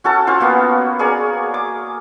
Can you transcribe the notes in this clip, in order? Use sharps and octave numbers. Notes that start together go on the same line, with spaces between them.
C#4 F#4 A4 A5
C#4 F4 C5
A#3 B3 F#4
G#4 A#4 C#5 D5
D6